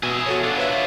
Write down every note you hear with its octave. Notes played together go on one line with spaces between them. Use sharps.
B2 G#4 E5
F#4 A4 C#5
D4 F4 F#5
B4 C#5 E5